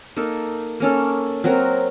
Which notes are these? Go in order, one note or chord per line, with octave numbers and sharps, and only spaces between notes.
A#3 D#4 A4
A#3 C#4 A4
F#3 C4 F#4 A#4